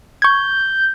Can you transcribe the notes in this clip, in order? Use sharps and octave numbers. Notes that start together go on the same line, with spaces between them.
C#6 G6 G#6